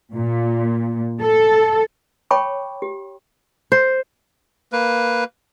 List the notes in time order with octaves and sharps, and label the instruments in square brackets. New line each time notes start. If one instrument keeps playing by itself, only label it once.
[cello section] A#2
A4
[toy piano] C#5 G5 A5 B5 C#6 D6
G4
[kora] C5
[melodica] A#3 B4